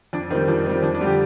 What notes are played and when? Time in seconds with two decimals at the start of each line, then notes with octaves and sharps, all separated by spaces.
0.13 F2 D4
0.30 D#3 C4
0.35 G3
0.48 F2 D4
0.66 D#3 C4
0.70 G3
0.83 F2 D4
0.95 D4
1.01 D3 G3
1.07 G4